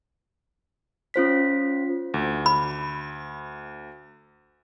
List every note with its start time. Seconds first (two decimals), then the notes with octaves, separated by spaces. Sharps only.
1.14 C#4 F4 C5 B6
2.14 D2
2.46 B5